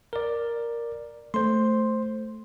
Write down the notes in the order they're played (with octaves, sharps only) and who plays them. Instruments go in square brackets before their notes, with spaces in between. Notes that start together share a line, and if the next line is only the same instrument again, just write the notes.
[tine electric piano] A#4 D5
[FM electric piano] A3 [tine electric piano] C5 C6